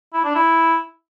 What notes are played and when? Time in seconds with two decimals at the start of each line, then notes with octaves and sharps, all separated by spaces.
0.13 E4
0.24 D4
0.35 E4